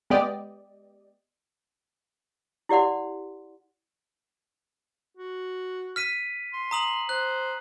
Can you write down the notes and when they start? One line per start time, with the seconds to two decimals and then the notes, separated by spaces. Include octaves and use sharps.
0.10 G#3 B3 G4 D5 D#5
2.69 E4 G4 D5 F#5 C6
5.17 F#4
5.96 F6 B6 D#7
6.53 C6
6.71 A#5 D#6 F#7
7.09 C5 F#6